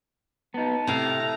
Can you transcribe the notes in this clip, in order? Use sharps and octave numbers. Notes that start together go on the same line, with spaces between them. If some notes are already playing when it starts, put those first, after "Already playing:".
B3 D#4 A5
A2 C3 F5 A#5